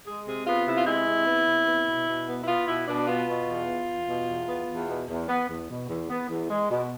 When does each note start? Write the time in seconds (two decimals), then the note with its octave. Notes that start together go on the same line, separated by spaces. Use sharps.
0.06 G#3 G#4
0.26 C3 G#4
0.47 B3 F4
0.66 C3 E4
0.76 F4
0.86 G#3 E4
1.07 C3
1.27 B3
1.46 C3
1.66 B3
1.87 B2
2.08 B2
2.27 B3
2.43 E4
2.48 B3 F4
2.67 B2 E4
2.88 B2 D4
3.07 B3 F4
3.27 B2
3.49 E2
3.68 B3
3.88 E2
4.08 B2
4.28 E2
4.48 B3
4.68 E2
4.89 B2
5.09 E2
5.29 B3
5.49 E2
5.69 B2
5.89 E2
6.10 B3
6.29 E2
6.50 G#3
6.70 B2